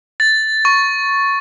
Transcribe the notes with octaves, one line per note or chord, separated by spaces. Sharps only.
A6
C#6